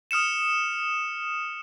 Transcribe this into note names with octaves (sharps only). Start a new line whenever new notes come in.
D#6 F6 C#7 E7